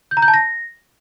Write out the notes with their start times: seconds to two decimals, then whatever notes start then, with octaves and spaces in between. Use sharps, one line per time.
0.11 G6
0.17 A#5
0.22 G6
0.28 A5
0.34 A#6